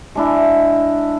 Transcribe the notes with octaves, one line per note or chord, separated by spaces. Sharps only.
G#3 D4 E4